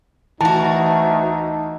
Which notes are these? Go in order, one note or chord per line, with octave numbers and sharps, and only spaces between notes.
D2 E3 D#4 F#4 A5